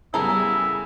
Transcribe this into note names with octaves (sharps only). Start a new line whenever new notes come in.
C#3 G3 B3 E4 A4 A#4 G#5